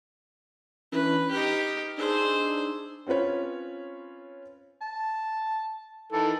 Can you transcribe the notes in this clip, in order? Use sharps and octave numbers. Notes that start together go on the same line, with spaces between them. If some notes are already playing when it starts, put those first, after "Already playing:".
E3 C#4 D4 B4
D#4 G4 F6
D4 D#4 G#4 C5 E6
C4 C#4 F4 B4 C#5
A5
D#3 E3 A4